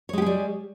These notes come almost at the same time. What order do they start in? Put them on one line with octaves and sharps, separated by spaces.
C#5 G#3 G4 G#4 G3